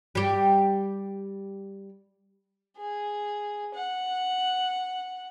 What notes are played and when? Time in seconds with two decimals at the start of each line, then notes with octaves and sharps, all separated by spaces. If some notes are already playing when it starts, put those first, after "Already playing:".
0.15 G3 G4
2.77 G#4
3.75 F#5